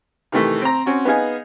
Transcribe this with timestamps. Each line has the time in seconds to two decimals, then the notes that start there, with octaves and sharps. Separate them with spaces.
0.32 C3 D#3 E3 A3
0.62 C4 A#5
0.86 C4 C#4 F#4
1.05 B3 D#4 G#4 F5 G#5